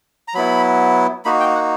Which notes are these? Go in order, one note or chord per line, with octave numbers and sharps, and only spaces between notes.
A#5
F#3 B3 E4 B5
A#3 D#4 F#4 B5
G5
F#5